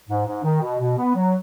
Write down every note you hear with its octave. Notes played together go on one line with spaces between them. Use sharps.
G#2
G#2
D#3
B2
B2
B3
F#3